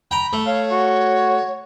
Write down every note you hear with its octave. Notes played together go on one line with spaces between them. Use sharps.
G5 A#5 B5
A3
C#5 F5
F#4